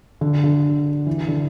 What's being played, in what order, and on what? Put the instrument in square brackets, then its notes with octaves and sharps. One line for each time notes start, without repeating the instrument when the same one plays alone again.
[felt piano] D3
D3
E3
D3